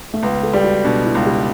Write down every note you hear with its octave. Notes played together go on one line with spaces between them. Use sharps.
A3
C#2 B3
A4
G3 G4
F#4
B2 D4
E4
C#2
G4